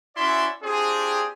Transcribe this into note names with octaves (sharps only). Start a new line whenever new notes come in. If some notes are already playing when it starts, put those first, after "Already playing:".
C#4 E4 F#4 D5 E5 C6
C4 D4 F4 G4 G#4